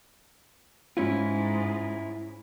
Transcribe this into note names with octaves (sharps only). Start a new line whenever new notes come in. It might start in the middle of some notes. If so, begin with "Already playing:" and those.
G#2 C#4 E4 F4